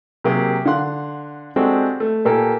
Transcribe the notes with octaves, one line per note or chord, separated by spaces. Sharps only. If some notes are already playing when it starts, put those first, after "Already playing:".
C3 F#3 A#3 G4 G#4
D3 F5 F#5 C6 F#6
G#3 C4 D4 F#4 G4 A4
A3
A#2 A#3 G4 A4 A#4 G#5